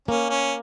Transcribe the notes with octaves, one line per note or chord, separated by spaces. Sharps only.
A#3 C#4
C#4